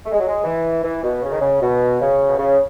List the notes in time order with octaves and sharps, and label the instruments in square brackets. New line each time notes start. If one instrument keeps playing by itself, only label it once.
[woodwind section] A3
G#3
F#3
G#3
E3
E3
B2
C#3
D#3
C#3
B2
C#3
B2
C#3